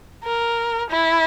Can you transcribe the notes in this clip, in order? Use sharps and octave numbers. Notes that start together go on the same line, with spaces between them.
A#4
E4